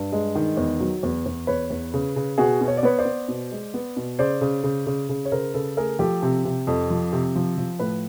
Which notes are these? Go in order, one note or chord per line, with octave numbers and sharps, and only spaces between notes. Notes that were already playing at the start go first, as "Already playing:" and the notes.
Already playing: G2
G#3
D#3
E2
F#3
E2
E2
E2 B4 C#5
E2
C#3
C#3
B2 F#4 G#4
B2
C#5
D5
B3 B4 C#5
C5 D5
B3
B2
G#3
B3
B2
C#3 C5 D5
C#3
C#3
C#3
C#3
C#5
C#3 A#4 C5
C#3 A4 B4
A3 G#4 A#4
F3 G4 A4
C3
C3
F2
F3
C3
F3
F3
A2 A4 B4